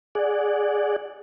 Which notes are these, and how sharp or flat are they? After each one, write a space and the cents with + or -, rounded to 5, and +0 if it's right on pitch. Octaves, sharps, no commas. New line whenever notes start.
G#4 +0 D5 +0 F#5 +0